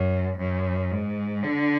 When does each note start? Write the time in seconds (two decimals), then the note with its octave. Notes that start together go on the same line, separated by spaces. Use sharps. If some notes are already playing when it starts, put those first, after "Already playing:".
Already playing: F#2
0.38 F#2
0.91 G#2
1.43 D3